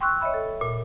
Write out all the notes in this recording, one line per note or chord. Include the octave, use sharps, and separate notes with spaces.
G5 C6 C#6 E6 F#6
C#5 D#5 E5 B5
A4
A#2